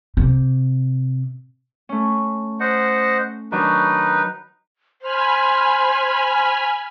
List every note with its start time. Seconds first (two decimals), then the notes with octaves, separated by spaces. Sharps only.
0.17 C3
1.89 A3 C#4
2.60 C5 D#5 F#5
3.52 D#3 F#3 D4 D#4 B4
5.02 C5 G#5 B5 F6